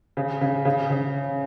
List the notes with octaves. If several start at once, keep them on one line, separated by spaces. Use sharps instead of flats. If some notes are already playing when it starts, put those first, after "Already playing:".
C#3
C#3
C#3
C#3